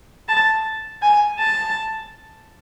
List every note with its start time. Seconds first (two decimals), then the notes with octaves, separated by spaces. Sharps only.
0.28 A5
1.02 G#5
1.39 A5